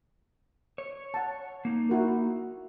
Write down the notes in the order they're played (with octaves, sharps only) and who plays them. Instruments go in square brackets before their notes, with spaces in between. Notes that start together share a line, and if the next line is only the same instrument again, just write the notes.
[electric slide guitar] C#5
[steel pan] F#5 A5
[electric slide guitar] A#3 D#4
[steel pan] E4 F#4 A#4